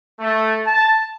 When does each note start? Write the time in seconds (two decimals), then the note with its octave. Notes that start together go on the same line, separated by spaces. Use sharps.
0.20 A3
0.65 A5